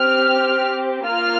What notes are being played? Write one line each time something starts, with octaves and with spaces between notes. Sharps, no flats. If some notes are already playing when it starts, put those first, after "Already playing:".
Already playing: C4 G4 F6
A#3 F4 F6